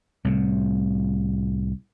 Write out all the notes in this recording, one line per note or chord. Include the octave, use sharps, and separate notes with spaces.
C2 A2 C3